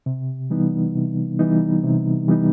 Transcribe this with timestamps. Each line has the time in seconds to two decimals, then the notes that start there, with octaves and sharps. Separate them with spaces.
0.06 C3
0.50 E3 G3 B3 D#4
0.95 C3
1.39 E3 G3 B3 D#4
1.83 C3
2.28 E3 G3 B3 D#4